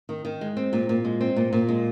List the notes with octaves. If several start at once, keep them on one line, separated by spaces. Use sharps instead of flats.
D#3
D#3
G#3
C4
A#2
A#2
G#3
C4
A#2
A#2
G#3